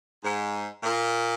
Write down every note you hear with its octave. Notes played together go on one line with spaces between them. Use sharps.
G#2
A#2